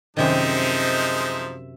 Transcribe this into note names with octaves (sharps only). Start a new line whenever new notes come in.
F#2 C3 D#3 F3 G#3 D#4 C5 E5